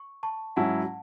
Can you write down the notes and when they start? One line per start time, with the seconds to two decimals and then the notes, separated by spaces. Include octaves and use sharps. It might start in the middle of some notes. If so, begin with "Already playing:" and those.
Already playing: C#6
0.23 A5 C#6
0.56 G#2 F#3 C#4 E4 F#5 A5